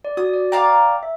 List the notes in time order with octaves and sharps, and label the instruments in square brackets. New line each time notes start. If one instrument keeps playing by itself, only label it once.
[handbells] D5
[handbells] F#4 [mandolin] D#6
[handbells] D5
[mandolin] D5 F5 A#5 [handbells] G5
[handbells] E5